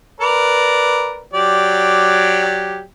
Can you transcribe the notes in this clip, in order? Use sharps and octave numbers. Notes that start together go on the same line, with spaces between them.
A#4 B4 D5
F#3 G4 D5